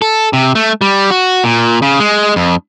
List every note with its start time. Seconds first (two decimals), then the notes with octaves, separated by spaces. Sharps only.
0.02 A4
0.33 C3
0.55 A3
0.81 G3
1.10 F#4
1.44 A#2
1.82 C#3
2.00 G#3
2.36 F2